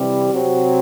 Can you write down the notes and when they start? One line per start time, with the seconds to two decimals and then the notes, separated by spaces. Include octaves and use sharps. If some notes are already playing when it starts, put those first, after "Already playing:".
Already playing: C3 E3 G3 C4
0.32 C3 F#3 C4 F#4